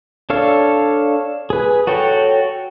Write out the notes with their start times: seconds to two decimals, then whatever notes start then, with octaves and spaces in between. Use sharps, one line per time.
0.30 D4 A4 C#5 F5
1.50 G#4 B4
1.87 F#4 A4 C#5 G5